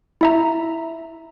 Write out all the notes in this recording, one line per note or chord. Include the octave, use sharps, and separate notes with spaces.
E4 E5 A#5